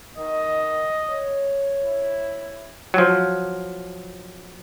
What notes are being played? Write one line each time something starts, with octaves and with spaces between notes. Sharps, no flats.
D#3 D#5
C#5
E4
F3 F#3